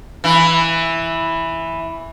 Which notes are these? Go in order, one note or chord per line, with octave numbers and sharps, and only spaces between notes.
E3 E4